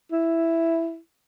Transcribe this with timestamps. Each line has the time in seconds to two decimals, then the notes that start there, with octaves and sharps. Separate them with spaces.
0.12 E4